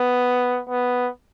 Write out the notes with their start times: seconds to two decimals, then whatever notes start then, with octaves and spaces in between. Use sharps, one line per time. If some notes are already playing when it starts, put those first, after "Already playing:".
Already playing: B3
0.70 B3